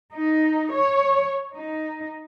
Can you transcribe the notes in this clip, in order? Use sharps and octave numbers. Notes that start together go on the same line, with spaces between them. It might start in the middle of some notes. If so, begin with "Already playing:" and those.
D#4
C#5
D#4